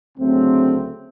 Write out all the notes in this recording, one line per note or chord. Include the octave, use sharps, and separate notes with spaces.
D2 C#3 F#3 A3 C4